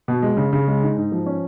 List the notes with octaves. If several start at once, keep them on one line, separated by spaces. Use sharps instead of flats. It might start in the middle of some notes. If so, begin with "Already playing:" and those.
B2
G#3
C#3
C#3
G#3
D#4
G#2
F3
C#4